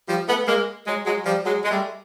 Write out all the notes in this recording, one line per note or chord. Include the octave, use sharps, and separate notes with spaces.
F3 G3
A3 B3
G#3 A#3
F#3 G#3
F#3 G#3
F3 G3
F#3 G#3
G#3
G3 A3